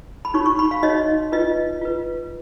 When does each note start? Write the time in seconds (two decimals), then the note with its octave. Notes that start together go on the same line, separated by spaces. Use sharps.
0.25 B5
0.34 D#4 F#4 C#5 C#6
0.46 C#6
0.59 B5
0.71 F5
0.83 D#4 F#4 C#5 D#5
1.32 F4 B4 D#5
1.81 F4 B4